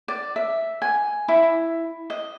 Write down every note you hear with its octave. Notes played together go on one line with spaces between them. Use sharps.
D5
E5
G#5
E4
D#5